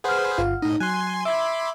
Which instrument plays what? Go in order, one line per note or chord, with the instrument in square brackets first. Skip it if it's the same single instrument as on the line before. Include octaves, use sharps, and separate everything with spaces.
[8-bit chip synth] G#4 B4 C5 [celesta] F#5 F6
[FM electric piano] G1 F4 F5
[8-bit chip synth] A2 D#5 [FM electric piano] D#4
[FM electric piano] F#3 [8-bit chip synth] G#5 C6 [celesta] F#6
[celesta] E5 [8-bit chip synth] B5 C6 D6 [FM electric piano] E6 G#6